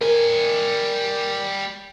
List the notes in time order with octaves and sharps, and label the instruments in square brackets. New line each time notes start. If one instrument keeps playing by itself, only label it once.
[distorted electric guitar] G3 G#5 [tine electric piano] A#4